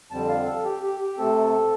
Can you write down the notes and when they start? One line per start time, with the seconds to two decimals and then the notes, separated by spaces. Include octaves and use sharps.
0.11 F2 D3 G3 C4 A5
0.29 F5
0.46 A4
0.65 G4
0.83 G4
1.00 G4
1.18 C3 A3 C4 A4